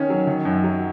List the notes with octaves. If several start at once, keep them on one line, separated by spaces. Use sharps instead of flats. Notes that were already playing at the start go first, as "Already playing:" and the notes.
Already playing: D#3 C#4
F#3
D#3
F#2
F#3